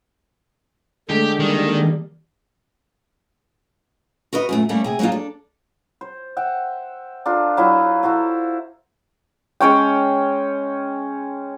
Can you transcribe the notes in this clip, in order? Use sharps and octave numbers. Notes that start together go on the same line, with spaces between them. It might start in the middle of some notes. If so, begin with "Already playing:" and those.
D3 G#3 A3 G4
D#3 G3 A#3
F#4 A#4 B4 D#5
F#2 A#2 A3
G3 A3 A#3 C#4 A4
C3 G#4 G#5
F#3 G#3 A#3 D#4 F4
D4 A4
C5
E5 F#5 G5
D4 F4 A4 A#4
F#3 E4 F4 D#5
E4 F#4 A4 C5
G#3 C#4 C#5 G5